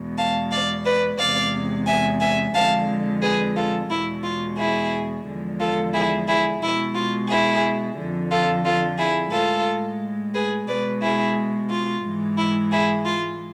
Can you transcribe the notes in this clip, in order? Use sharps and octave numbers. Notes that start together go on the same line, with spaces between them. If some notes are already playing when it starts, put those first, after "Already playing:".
Already playing: E2 B2 G#3
F5 A5
D5 F5
B4 D5
E2 C3 G#3 D5 F5
E5 G#5
E5 G#5
F2 D3 G#3 F5 A5
G#4 B4
F4 A4
E2 B2 G#3 E4
F4
E4 G#4
E2 D3 F3 G#3
F4 A4
E4 G#4
E4 G#4
B2 G#3 E4
F4
E4 G#4
F2 D3 F3
F4 A4
F4 A4
E4 G#4
A2 G#3 F4 A4
G#4 B4
B2 G#3 B4 D5
E4 G#4
F4
G#2 E3 G#3
E4
E4 G#4
F4